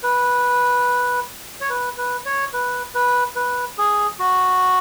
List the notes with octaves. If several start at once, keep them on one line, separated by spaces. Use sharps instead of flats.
B4
C#5
B4
B4
C#5
B4
B4
B4
G#4
F#4